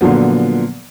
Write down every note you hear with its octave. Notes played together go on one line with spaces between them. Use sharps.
A#2 D3 F3 F#3 B3